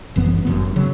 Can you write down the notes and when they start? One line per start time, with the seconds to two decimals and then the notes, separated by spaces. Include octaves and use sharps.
0.16 G1 F#2 E3 B3
0.45 G1 F#2 E3 B3
0.76 C#3 F#3